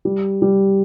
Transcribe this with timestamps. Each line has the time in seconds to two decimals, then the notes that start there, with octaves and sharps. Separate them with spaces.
0.05 G3
0.42 G3